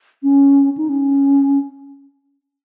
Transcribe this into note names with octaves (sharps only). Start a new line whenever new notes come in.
C#4
D#4
C#4